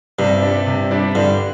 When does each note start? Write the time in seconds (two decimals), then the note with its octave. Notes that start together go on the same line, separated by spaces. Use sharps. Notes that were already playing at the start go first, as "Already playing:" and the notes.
0.18 G2 C3
0.42 G3 D4
0.66 C3
0.91 G3 D4
1.15 G2 D3